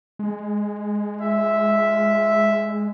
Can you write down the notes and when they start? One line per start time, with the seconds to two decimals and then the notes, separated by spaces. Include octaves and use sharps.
0.19 G#3
1.20 F4 E5